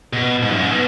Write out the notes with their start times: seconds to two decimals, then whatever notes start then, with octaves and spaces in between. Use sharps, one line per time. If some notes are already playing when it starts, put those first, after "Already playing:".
0.13 B2
0.42 G#2
0.52 F#2
0.61 G#2
0.72 B2